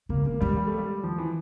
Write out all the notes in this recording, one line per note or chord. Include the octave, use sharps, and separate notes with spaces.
C#3 A#3
D3 A#3
E3 G3
G3
A3
G3
F3
E3